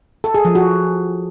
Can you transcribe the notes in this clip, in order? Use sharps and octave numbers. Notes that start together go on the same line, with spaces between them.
A4
G#4
F3
F#4